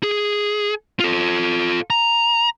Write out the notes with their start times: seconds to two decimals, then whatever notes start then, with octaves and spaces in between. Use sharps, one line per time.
0.03 G#4
1.00 F4 A4
1.90 A#5